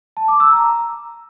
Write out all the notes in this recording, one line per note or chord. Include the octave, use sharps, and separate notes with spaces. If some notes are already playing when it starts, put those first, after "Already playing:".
A5
D6
E6
A#5